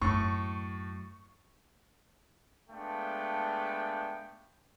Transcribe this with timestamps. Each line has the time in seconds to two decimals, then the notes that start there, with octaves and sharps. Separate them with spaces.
0.02 F#2 A2 C#6
2.70 G#3 A3 B3 D4 F5 G5